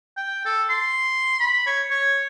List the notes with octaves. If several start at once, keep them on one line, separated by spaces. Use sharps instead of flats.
G5
A4
C6
B5
C#5
C#5